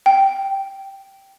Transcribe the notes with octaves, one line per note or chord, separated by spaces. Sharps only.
G5